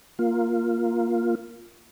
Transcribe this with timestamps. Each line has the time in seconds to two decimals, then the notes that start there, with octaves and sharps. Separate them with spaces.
0.19 A#3 F4